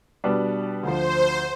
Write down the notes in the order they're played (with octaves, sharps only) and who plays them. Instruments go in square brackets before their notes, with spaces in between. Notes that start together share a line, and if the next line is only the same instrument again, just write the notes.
[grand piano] B2 G3 B3 D4
[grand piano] D2 D3 F3 [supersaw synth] C5